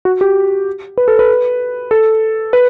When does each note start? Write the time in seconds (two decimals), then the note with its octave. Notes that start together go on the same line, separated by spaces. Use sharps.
0.05 F#4
0.21 G4
0.98 B4
1.08 A4
1.19 B4
1.91 A4
2.53 B4